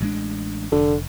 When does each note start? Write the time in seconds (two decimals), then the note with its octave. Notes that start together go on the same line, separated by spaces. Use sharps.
0.01 A1 G#3 D4
0.72 F1 D3